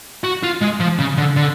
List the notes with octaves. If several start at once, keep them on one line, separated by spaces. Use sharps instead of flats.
F#4
F4
G#3
F3
C#3
D3
D3